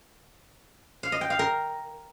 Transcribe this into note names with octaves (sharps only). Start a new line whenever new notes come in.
F5
D#5
G5
F5
A#4